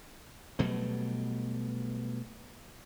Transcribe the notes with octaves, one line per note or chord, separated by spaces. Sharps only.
B2 F#3 G3 A3